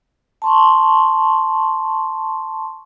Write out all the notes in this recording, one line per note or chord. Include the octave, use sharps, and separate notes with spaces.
A5 C6 C#6